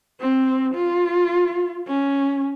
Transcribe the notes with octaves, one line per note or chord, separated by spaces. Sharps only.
C4
F4
C#4